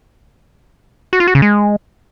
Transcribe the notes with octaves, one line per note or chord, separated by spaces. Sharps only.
F#4
F4
F#4
C#3
G#3